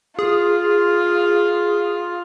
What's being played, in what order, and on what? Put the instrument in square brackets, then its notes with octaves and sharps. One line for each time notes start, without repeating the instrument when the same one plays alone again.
[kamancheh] F4 [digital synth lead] G#4